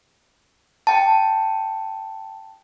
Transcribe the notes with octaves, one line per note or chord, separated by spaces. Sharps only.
G5 A5